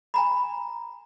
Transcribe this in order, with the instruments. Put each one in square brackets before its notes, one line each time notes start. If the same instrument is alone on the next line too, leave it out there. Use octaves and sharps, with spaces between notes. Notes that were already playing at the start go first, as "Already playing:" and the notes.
[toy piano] G#5 A#5 B5